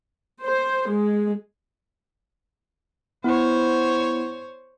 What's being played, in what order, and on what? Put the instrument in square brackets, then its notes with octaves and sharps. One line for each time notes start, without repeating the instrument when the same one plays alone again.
[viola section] C5
G#3
[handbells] B3 E4 [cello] C5 C#5